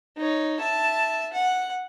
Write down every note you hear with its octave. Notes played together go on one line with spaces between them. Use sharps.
D#4 C#5
E5 A5
F#5